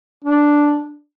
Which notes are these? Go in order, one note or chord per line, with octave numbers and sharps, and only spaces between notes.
D4